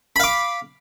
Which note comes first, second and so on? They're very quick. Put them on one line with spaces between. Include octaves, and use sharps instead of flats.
B5 F5 D6